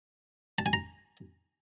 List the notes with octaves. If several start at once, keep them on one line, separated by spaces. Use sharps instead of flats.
A5
G#5
A#5